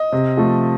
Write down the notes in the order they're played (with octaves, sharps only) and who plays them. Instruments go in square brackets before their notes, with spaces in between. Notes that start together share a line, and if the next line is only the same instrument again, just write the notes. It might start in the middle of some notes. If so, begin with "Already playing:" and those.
Already playing: [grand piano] D#5
C3
F3 A3